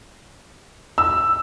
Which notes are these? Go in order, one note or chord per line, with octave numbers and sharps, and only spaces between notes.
E6